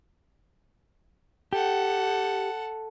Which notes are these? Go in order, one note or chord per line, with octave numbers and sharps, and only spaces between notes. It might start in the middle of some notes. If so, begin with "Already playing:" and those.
G4 A4 F#5